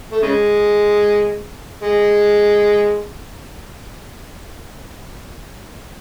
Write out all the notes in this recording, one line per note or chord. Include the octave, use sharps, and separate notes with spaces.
A3
C#3 G#3
G#3